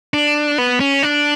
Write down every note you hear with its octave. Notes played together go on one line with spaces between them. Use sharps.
D4
B3
C#4
D4